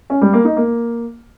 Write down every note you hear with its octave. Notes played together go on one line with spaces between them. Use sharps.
C#4
G3
A#3
D#4
A#3